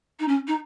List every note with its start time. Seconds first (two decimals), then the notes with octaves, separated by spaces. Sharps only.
0.19 D#4
0.28 C#4
0.47 D#4